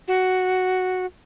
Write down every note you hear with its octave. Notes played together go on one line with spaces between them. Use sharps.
F#4